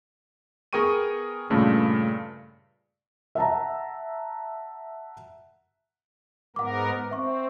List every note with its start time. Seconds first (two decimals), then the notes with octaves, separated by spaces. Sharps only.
0.73 B3 G#4 A#4 G5 C#6 D#7
1.50 G2 A#2 C#3 A3
3.35 E5 F#5 A5 A#5
6.56 G#2 B3 A#4 F#5 D6
7.11 C4 E5 C#6